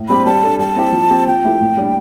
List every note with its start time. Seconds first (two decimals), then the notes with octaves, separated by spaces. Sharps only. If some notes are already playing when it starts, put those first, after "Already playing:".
Already playing: A2
0.08 G3 C4 G4 B5
0.26 G3 A5
0.43 D4 A4
0.59 G3 A5
0.76 C4 E4 G4
0.93 F3
1.10 C4 G4
1.27 F3 G5
1.44 A3 E4 G4
1.61 A2
1.77 G3 D4